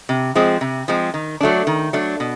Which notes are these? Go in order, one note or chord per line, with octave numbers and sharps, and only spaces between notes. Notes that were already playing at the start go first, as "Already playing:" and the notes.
C3
F3 G#3 C4
C3
F3 G#3 C4
D#3
F#3 A3 D4
D#3
F#3 A3 D4
B2